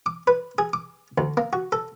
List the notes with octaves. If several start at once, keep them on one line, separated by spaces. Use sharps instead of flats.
D6
B4
G#4
D6
D2
A#3
F#4
A4